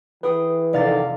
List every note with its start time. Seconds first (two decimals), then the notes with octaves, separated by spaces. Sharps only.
0.23 E3 G#4 B4 G5 D#6
0.73 F1 D3 D#3 D5 F5 A6